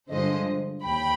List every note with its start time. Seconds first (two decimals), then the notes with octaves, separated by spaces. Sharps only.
0.11 G2 D3 F3 G#3 C5 D#5
0.84 D#2 G5 B5